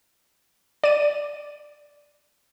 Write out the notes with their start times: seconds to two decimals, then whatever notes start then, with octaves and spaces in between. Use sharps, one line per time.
0.84 D5 D#7